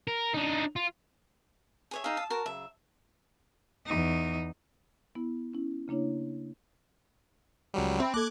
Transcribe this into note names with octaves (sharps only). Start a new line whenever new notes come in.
A#4
D4 D#4
F4
G#4 C#5 E5
D#4 G#4 F5 D#6 E6
A5
F#4 A#4 A5
C#3 F#3 E5
E2 D#4
B3 E4
C#4 E4
C#3 A#3 D4 E4 C#5
C#2 F#3 G3
C4 E5 B5
A#3 A4 D6 F#6 G#6